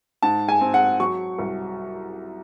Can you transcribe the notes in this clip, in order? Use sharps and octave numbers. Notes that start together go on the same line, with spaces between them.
G#2 A5
G#5
C4
F#5
F#3 C#6
C2